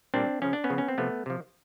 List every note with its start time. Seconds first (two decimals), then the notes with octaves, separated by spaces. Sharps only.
0.14 A#2 G3 C4 D4
0.42 C#3 F3 C#4
0.53 D4
0.64 B3 C#4
0.70 C#3 F3
0.78 C#4
0.88 C4
0.98 C3 F3 A3 B3
1.26 C3 F3